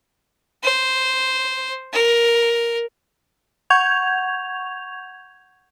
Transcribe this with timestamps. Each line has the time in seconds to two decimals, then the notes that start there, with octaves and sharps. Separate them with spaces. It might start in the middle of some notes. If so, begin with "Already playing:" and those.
0.63 C5
1.93 A#4
3.70 F#5 C#6 G6 G#6 F7